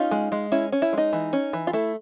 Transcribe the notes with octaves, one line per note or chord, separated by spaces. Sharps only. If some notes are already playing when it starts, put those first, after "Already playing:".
Already playing: C#4 D#4 F4
G#3
G#3
C#4 E4
C#4
E4
G#3 D#4
E3
C#4
E3
F4
A3 E4